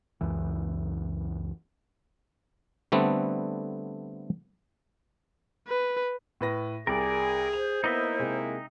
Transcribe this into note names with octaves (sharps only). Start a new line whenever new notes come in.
C#2 F#2 E3
D3 G3 A3 B3 C4
B4
A2 B4 A#6
C2 G#4 A#4 D5 G#5
C5 F7
A#3 B3 D#4 E4 D#5 E5
C3 G#3